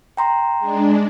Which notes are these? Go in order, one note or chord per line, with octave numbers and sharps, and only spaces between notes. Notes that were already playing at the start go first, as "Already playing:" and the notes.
G5 A#5 C6
G#3 D4